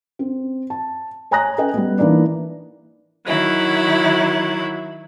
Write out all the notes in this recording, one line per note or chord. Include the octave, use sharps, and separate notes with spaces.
C4
A5
C#5 G#5 A#5 D#6 F#6 A#6
C#4 A4 B4 D#5 G5 G#5
G3 B3
E3 A#3 D4 D#4 B4 D5
D#3 F#3 E4